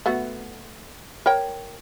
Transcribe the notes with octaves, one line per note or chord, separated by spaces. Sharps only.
A3 B3 F#4
A#4 C#5 G5